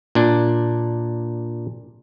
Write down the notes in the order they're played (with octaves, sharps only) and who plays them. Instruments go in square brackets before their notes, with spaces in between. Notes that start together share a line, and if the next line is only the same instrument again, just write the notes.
[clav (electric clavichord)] A#2 D4